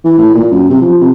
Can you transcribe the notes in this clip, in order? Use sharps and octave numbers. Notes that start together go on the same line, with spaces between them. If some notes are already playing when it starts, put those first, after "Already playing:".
E3
A2
A#2
F#2
C3
F3
C3